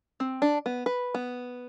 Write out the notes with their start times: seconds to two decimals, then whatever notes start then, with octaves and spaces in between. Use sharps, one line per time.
0.20 C4
0.42 D4
0.66 B3
0.86 B4
1.14 B3